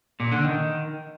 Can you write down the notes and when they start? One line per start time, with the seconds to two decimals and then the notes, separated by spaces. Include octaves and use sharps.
0.20 A#2
0.32 D3
0.44 D#3